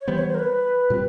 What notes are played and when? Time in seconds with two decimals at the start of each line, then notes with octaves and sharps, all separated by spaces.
0.01 C#5
0.08 E3 G3 B3 C5
0.18 C#5
0.29 C5
0.34 A#4
0.39 B4
0.90 A#2 G3 C4